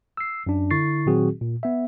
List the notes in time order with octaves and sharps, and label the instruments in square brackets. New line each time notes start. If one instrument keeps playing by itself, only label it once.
[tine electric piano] E6 C7
F#2 D4
D3 E4 C#6 A6 C7
A#2 D#3 F#3 C4 F#4 G#4
A#2
B3 E5